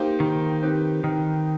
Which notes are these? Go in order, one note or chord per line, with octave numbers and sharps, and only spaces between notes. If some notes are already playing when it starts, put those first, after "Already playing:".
Already playing: A#3 D#4 G4 C5
D#3
C4 D#4 G4 B4
D#3